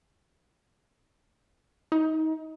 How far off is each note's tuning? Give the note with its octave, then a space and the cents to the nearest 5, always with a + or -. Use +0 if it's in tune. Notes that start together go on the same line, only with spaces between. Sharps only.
D#4 +25